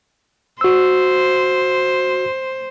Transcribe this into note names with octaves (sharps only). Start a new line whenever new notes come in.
F#4 C5 E6